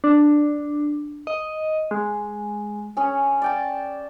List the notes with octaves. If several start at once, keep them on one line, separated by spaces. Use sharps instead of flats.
D4
D#5
G#3
C#4 G#4
D5 G5 A5